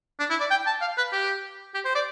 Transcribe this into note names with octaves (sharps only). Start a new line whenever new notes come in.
D4
E4
D5
G5
A5
F5
B4
G4
G4
C5
D5